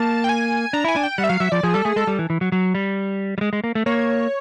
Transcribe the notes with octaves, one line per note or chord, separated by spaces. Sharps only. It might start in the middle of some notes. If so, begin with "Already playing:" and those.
Already playing: A#3 A5
G5
G#5
D4 A#5
E4 G#5
D4
G5
G3 F#5
E5
F#3 F5
F#3 E5
F3 D5
F3 G#4
G3 A4
A3 G#4
G#3 A4
G3
E3
E3
F#3
F#3
G3
G3
G#3
G#3
A#3
A3
A#3 C#5